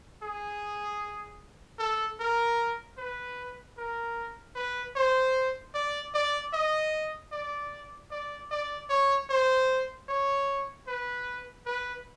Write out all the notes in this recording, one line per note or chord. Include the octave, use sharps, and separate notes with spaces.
G#4
A4
A#4
B4
A#4
B4
C5
D5
D5
D#5
D5
D5
D5
C#5
C5
C#5
B4
B4